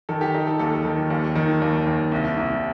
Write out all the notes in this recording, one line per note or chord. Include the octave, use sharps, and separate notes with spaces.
D#3 A4
G4
D#4 G4
A4
D#2 A4
D#3
D#2
D#3
D#2
D#2
C2
C2